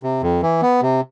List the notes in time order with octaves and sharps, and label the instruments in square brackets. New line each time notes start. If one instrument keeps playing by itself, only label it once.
[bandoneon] C3
F2
E3
B3
C3